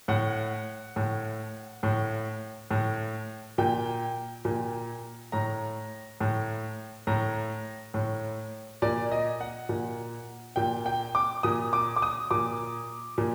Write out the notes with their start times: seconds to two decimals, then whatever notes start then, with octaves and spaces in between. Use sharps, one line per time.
0.08 A2 F#5
0.96 A2
1.83 A2
2.71 A2
3.58 A#2 G5
4.45 A#2
5.32 A2 A#5
6.21 A2
7.07 A2 A#5
7.94 A2
8.82 A#2 D5
9.11 D#5
9.41 F#5
9.69 A#2
10.56 A#2 G5
10.86 G5
11.15 D6
11.43 A#2 D#6
11.73 D6
11.96 D6
12.02 D#6
12.31 A#2 D6
13.18 A#2